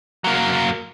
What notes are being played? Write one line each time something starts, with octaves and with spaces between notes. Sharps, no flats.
F#3 A#3